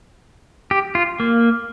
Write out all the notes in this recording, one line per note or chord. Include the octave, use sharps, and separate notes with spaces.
G4
F4
A#3